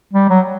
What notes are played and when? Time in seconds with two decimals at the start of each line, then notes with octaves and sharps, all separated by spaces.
0.13 G3
0.29 F#3